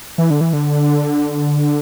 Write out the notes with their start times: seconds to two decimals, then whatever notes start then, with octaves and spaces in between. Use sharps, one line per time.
0.18 E3
0.30 D3
0.41 E3
0.53 D3